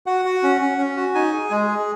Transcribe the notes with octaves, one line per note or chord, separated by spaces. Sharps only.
F#4 F#5
F#4
C#4
C#4
C#4
F#4
D#4 G#5
G#4
G#3
G#4